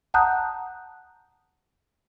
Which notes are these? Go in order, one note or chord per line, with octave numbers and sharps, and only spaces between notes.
F#5 A5 A#5 D#6 F#6 G6